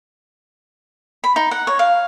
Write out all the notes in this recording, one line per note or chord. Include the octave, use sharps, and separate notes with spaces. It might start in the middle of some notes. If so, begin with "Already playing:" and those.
B5
D#4
F#5
C#5
F5